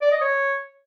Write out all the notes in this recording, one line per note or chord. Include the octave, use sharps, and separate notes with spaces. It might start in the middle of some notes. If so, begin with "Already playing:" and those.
D5
D#5
C#5